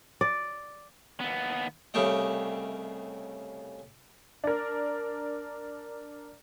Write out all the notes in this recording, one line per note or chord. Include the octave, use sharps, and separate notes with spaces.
D5
D#2 B3
C2 C#3 A3 G4 D#5
D4 A#4